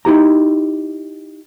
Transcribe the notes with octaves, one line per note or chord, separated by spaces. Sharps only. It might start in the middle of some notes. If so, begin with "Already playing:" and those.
D#4 E4 G4 A#5